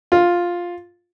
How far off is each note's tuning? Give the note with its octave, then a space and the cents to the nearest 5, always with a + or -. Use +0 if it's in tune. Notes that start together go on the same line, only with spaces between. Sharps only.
F4 +5